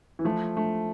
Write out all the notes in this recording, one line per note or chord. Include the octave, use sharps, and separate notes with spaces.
E3
F3 A3
A3